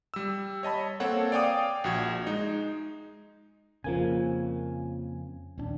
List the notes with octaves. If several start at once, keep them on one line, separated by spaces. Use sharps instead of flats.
G3 E6
C#5 D#5 A5 B5
A#3 C4 A4 C#5 F#5
D5 F5 G5 G#5 D6 D#6
A#1 F#4 G#6
G#3 D#4
F2 C#3 F3 A#3 G#5
D#1 C#4 D4